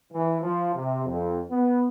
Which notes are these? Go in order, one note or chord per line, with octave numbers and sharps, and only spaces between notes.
E3
F3
C3
F2
B3